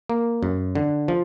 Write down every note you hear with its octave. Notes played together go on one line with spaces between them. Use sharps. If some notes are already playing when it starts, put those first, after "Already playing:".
A#3
F#2
D3
F3